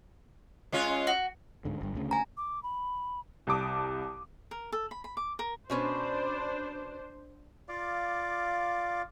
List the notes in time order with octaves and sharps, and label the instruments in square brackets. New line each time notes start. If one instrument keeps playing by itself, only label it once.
[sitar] G#3 C#4 F4
[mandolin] F#4
[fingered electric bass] D1 G#2 D3
G1 G2
D2 C#3
[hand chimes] G#5 A#5
[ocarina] D6
B5
[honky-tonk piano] C2 A5 D6 D#6
[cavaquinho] A#4
A4
B5
B5
D6
A#4
[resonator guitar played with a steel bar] B2 C#4 B4 [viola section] D4 C5
[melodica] F4 D5 F5 D6